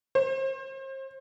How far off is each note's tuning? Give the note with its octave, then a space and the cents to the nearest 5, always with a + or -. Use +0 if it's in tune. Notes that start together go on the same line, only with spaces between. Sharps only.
C5 +30